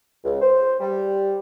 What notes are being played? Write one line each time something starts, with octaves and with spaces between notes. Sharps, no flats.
C#2
C5
G3